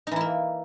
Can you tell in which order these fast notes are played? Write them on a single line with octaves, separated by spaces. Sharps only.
D#4 E3 E4 A#3